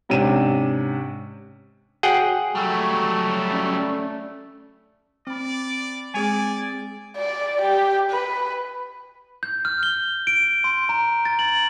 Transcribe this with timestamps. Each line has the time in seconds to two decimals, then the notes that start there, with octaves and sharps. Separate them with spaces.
0.09 G#2 C3 C#4 D4 D#7 E7
2.03 F#4 G#4 C#5 F#5 G5 C7
2.55 F#3 G3 A3 A5 C#6 E6
3.53 C#4 D5
5.27 C4 D5 B5
6.14 G#3 C4 G#4 D5 G#5 G#6
7.17 D5
7.61 G4
8.11 B4
9.43 G6
9.65 F6
9.83 G7
10.27 D7
10.64 C6
10.89 A#5
11.25 A6
11.39 F#7